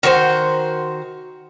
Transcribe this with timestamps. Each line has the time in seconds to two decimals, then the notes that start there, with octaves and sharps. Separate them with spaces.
0.03 D#3 F#4 B4 C5